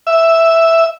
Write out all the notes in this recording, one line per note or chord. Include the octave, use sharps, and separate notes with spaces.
E5